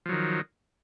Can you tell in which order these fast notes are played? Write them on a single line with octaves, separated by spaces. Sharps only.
F3 F#3 D#3